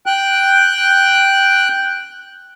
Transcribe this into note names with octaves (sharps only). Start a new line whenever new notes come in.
G5 F#6